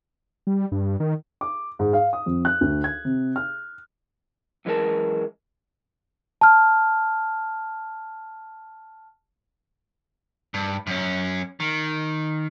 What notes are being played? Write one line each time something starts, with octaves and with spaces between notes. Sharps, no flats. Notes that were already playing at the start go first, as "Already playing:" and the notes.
G3
G2
D#3
D6
G#2
F5
D#6
F2
F#6
D2
G#6
C3
F6
F#2 E3 G#3 A#3 A#4 A5
A5 F6
G2
F#2 C#4
D#3